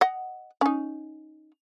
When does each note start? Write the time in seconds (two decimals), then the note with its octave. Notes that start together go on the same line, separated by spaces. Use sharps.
0.01 D#5 F#5
0.61 C#4 D#4